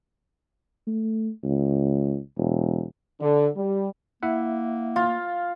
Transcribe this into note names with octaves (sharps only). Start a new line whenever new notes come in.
A3
C#2
E1
D3
G3
A#3 E4 E5 F#5
F4